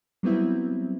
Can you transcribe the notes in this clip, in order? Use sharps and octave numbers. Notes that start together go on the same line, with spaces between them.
F#3 G3 B3 C4 E4